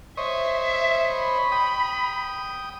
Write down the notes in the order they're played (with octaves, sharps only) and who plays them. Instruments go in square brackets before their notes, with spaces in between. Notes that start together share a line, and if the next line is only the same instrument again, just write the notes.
[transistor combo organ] C5 C#5 D#5 [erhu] E5
[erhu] E5
B5
[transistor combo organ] G5 D#6